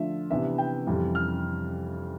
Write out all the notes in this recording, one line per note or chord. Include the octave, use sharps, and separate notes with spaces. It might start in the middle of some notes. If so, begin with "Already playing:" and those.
Already playing: D3 F3 A3 D4 F4 E5
C3 E3 B3 D4 E5
G5
F2 C3 E3 G3
F6